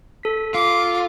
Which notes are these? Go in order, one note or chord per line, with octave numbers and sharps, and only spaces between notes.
A4 B6
F4 D6